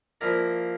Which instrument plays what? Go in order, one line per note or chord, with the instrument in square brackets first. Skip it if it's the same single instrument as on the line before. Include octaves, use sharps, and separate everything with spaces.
[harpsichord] F3 A#3 E4 A#4 D5